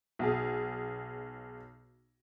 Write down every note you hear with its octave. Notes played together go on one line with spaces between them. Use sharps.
B1 G#4